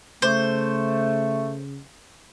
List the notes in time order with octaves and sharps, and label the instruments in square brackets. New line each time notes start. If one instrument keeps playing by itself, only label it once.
[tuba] C#3 [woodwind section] A3 [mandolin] C5